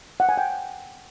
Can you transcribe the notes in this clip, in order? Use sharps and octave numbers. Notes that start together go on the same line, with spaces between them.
F#5
G#5
G5